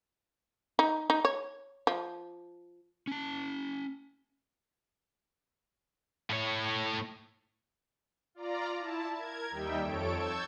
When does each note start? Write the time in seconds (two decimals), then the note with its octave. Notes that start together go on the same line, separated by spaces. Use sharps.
0.79 D#4
1.10 D#4
1.25 C#5
1.87 F3
3.07 C#4 A5
6.30 A2 C#5
8.35 F4 D5 A#5
8.78 E4 A5
9.13 A#4 G#6
9.51 D#2 G3 D#4 E5 G5
9.82 F2 A4 C#5 D7
10.12 A5 C#6 E6 G6 G#6